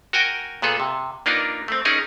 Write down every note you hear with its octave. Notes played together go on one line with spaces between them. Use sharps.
F#4 A#4 G5 G#5
A#2 B3 G#4 A4
C3
A#3 D4 D#4 F4 A#4 B4
A3 C4
C#4 D#4 G#4 A#4